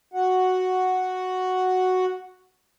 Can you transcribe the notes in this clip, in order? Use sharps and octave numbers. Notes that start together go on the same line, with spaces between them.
F#4 F#5